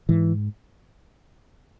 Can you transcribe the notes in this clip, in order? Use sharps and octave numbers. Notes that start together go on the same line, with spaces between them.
G#2 E3